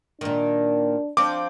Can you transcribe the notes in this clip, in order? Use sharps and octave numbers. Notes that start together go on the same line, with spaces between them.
A#2 D#3 D4
F3 C4 D4 D6